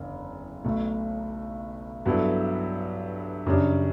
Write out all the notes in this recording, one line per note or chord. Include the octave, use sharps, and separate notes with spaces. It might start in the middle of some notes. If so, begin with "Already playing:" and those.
Already playing: F#1 E2 D3
B1 B2 A3
G2 F#3 B3 E4 A4
F#2 C#3 G3 D4